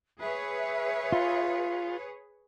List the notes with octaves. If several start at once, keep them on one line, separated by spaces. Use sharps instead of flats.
G#4 B4 C#5 E5
F4